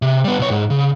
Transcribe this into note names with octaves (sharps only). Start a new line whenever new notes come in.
C3
G3 B3
B1 C#5
G#2
C#3